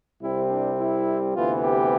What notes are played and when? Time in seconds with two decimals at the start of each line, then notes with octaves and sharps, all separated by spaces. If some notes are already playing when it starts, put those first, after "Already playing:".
0.22 C2 C3 G3 C4 E4
0.50 D4
0.78 E4
1.35 D2 C3 E3 B3 F4
1.63 G4